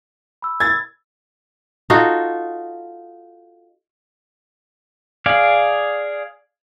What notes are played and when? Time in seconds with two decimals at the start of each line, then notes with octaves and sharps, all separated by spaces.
0.42 B5 E6
0.60 E6 G#6 A6
1.90 D#4 F4 F#4 A4
5.26 G#4 D5 F5